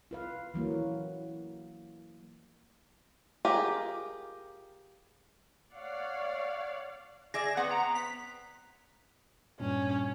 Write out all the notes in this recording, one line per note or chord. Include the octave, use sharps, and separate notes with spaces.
F4 B4 F5
E3 F#3 A#3
F4 G4 G#4 A#4
C#5 D5 F5 F#5
G#4 D5 E5 A#6
B3 C4 B4 F#5
A#5
B6
G2 A#2 C#4